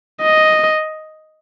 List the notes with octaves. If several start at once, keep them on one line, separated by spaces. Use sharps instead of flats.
D#5